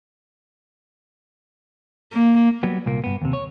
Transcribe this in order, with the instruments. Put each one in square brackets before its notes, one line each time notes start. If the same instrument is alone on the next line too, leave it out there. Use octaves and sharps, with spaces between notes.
[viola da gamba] A#3
[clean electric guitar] F#3 G3 B3
C2 A#2 A#3
G2 B3
D#2 C3
C#5